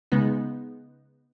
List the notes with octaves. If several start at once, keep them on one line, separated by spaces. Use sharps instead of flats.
C#3 G#3 B3 D#4